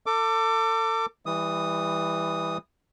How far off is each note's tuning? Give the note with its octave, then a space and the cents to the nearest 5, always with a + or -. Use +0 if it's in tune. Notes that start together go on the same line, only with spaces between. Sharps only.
A4 +35 D6 +0
E3 +0 G3 +25 D#6 +0